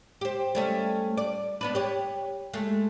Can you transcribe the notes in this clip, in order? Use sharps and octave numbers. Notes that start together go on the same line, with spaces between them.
G4 C5
G3 A3 C#4
D5
B3 D4 B4
G4 C#5
G#3 A3